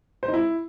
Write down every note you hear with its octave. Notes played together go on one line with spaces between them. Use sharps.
C5
D#4
E4